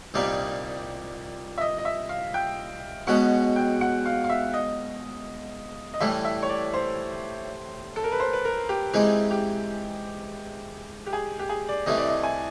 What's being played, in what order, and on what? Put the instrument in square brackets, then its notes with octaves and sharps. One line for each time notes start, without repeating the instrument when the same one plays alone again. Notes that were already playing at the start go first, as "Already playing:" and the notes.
[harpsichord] C2 A#2 G3 C4 D#4 [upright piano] D5
[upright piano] E5
D#5
D#5
E5
F5
G5
[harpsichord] B2 G#3 C#4 F#4 [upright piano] F#5
[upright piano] G5
F#5
F5
F5
E5
D#5
D#5
[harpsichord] A2 E3 G3 [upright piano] E5
[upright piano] E5
C#5
D5
C5
A4
A#4
B4
C5
B4
A#4
G4
[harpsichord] E3 G#3 C4 D#4 [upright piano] G4
[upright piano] G4
G4
G#4
G4
G#4
D5
[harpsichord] C2 C3 E3 A3 [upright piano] D#5
[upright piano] D5
D#5
G#5